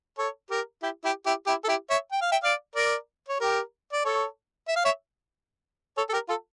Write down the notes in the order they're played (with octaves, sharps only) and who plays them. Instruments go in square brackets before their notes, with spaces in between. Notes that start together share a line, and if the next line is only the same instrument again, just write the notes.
[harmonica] A4 C#5
G4 A#4
E4 G4
E4 G4
E4 G4
E4 G4
A4
E4 G4
C#5 E5
G5
F5
E5 G5
D5 F5
A#4 D5
C#5
G4 A#4
D5
A4 C#5
E5
F5
C#5 E5
A4 C#5
A4
G4 A#4
F4 A4